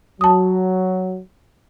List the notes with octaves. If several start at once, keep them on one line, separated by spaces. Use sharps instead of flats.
F#3 A5 D#6